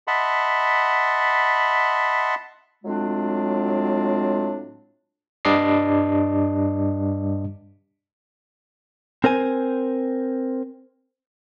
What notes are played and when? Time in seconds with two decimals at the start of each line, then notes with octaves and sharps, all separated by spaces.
0.07 D#5 E5 F#5 A5 B5 C6
2.84 A2 F#3 G#3 C4 D4 F4
5.45 G2 G3 D4 D#5 D6 C7
9.24 C4 A#4 C5 G#5